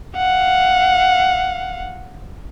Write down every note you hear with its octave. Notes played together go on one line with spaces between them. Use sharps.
F5 F#5